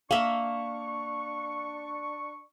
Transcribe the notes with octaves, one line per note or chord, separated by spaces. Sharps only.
A#3 D4 E5 F5 C#6